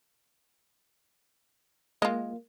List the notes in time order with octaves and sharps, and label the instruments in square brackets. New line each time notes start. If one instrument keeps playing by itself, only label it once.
[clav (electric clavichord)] G#3 [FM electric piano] A#3 [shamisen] F4 D#5